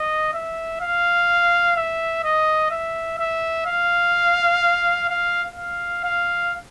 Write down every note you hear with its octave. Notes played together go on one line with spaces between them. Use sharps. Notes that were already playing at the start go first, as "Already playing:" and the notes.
Already playing: D#5
E5
F5
E5
D#5
E5
E5
F5
F5
F5
F5